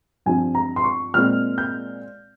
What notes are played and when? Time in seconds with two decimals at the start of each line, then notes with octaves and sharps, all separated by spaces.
0.26 G2 F3 C4 G#5
0.55 A#5
0.76 C6
0.84 C#6
1.14 A#2 G#3 C4 F6
1.58 G6